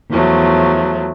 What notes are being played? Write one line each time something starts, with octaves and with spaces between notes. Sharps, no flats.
E2 F3 F#3 A3